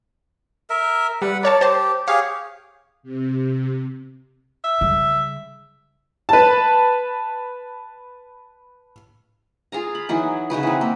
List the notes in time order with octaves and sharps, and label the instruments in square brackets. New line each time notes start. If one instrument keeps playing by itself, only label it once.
[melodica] A#4 E5
[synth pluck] G3 [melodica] B4 F#5
[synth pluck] A#4 C#5 A5 [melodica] D5
[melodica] G4 [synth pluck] C5 A5
[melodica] G4 G#4 C#5 [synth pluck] F5
[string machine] C3
[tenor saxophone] E5
[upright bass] C#3 G3
[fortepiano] B4 A5
[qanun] F4 G#4 F5 A#5
B5
E3 F#3 D#4
C#3 D#4 F#4 B4
E3 C4
A#3